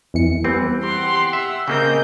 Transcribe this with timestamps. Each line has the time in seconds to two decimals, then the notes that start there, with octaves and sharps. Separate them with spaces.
0.14 F2 E3 C#7
0.44 E3 G3 B3 C4
0.83 G4 F#5 C6
1.33 E5 E6
1.68 C#3 A#3 C4 A#4 D#5 G6